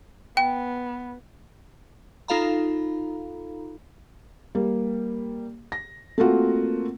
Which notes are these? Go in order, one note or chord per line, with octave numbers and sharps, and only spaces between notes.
B3 G5
D#4 F4 A4 F5 A#5 B5
G3 A#3
A#6
A3 A#3 C4 F4 F#4 A#4